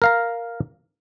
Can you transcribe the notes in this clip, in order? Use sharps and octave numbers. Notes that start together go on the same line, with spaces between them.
A#4 F5 A#5